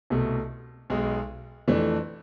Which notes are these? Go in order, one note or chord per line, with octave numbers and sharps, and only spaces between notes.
C2 B2 A3
B1 B2 G#3
F2 E3 A3 D4